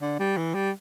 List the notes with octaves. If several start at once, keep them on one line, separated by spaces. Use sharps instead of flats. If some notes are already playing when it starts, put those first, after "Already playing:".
D3
G3
E3
G3